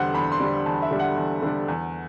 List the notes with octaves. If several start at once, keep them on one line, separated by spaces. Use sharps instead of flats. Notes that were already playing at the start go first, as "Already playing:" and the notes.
Already playing: E2 D3 G3 D4 C5 F#5
E2 B5
C6
D3 G3 D4
E2 A5
E5
D3 G3 D4
F#5
E2
D3 G3 D4
E2